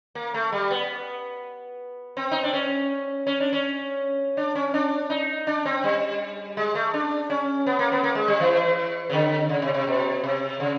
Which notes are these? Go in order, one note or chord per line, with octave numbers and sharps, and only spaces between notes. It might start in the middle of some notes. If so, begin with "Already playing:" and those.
A#3
A3
G3
B3
C4
D#4
D4
C#4
C#4
D4
C#4
D4
C#4
D4
D#4
D4
C4
G3
G#3
A3
D4
C#4
B3
A#3
B3
A#3
G#3
G3
E3
C#3
D3
C#3
C3
C3
B2
C3
C#3